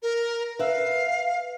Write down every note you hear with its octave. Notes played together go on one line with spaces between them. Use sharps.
A#4
B4 E5 F5